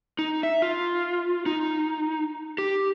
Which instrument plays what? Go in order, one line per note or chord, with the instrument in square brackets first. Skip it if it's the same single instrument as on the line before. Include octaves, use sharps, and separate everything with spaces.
[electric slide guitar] D#4
E5
F4
D#4
G4